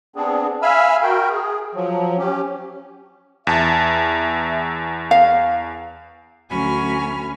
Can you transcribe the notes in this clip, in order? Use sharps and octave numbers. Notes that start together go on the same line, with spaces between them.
B3 C4 D4 G#4
E5 F5 G#5 B5 E6 F6
F#4 A#4 G5
G#4
F3 F#3
C#4 G4
E2 E5 A5
F5
D2 F#3 C#4 G#5 B5 F6